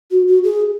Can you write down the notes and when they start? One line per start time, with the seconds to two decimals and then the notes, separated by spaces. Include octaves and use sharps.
0.11 F#4
0.27 F#4
0.44 G#4